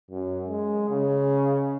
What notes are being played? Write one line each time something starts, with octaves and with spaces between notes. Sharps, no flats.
F#2
G#3
C#3